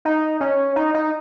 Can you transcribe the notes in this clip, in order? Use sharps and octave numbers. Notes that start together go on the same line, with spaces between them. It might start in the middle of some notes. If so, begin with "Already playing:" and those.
D#4
C#4
D#4
D#4